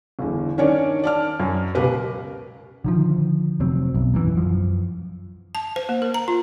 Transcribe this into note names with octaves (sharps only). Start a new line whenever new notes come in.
G1 E2
D#3 C#4 D4 A#4 C#5 D5
D5 A5 F6
F#2
C#2 B2 G4 A#4 B4
D3 D#3 F3
F1 F#3 C4
B1
G#1 F#2 A#2 E3
F#2 F3
A5
C5
A#3
A#4
A#5
F4